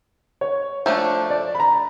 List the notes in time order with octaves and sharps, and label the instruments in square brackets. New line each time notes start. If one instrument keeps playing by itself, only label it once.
[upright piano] C#5
[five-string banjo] F3 A3 D4
[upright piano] D5
B5
A#5